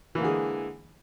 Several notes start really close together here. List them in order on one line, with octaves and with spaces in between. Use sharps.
E3 A#3 D3 G#4 G#3